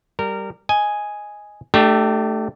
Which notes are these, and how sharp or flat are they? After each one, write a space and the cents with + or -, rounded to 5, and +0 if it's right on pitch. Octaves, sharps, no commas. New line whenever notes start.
G3 +0 A#4 -20
D#5 +0 G#5 +0
A3 +0 D4 +30 G4 -15